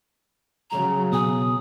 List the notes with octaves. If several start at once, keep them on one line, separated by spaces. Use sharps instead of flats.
C#3 F#3 A#5
B2 G#4 D#6